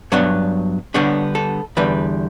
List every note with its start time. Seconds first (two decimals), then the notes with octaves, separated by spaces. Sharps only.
0.12 G2 F#3 B3 D4 C#5
0.94 D3 G3 B3 D4 C#5
1.35 A4
1.77 E2 D3 G3 B4